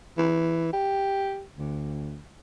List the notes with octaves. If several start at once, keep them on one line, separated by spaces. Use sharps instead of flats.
E3
G4
D2